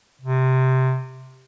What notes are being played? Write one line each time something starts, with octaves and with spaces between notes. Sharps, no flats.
C3